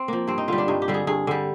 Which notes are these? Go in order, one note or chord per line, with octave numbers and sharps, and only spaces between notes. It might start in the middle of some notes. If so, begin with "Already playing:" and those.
Already playing: C4
F3 A#3
G2 C4
D#4
D3 G3 F4
D4
G2 D#4
G4
D3 G3
G#4
G2 G#4
D3 G3